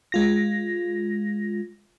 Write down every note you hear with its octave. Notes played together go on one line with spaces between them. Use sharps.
G#3 F4 A#6